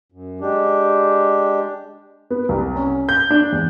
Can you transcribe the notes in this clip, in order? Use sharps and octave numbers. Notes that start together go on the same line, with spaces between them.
F#2
G#3 D4 G4
B3
C2
C#4
G6
D4
E2